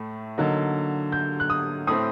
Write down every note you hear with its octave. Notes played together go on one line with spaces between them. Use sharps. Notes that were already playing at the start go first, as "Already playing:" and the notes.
Already playing: A2 A3
D3 F#3 A#3 D#4
G6
F#6
D#6
A2 A3 C4 D#6